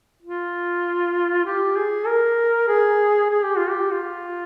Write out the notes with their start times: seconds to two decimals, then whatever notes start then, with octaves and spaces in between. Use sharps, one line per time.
0.22 F4
1.45 G4
1.76 G#4
2.07 A#4
2.68 G#4
3.30 G#4
3.44 G4
3.57 F4
3.70 G4
3.91 F4